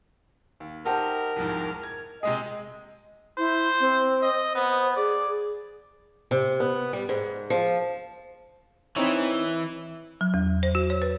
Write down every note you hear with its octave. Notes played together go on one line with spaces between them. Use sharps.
D#2
D#4 G4 A#4 C5 F#5 G5 A5
C2 F2 G#2
G#6
C3 G#3 G#4 D#5 D#6
E4 C5
C4
D#5
B3 C5
G#4 D5
C3
B3
G3
G#2
F3
E3 C4 D#4 C#5
F#3
E2
C5
F#4
C#5
B4